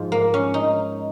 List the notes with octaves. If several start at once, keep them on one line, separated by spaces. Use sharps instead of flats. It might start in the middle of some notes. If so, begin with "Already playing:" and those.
Already playing: G#2 F3
A#3
C#4
D#4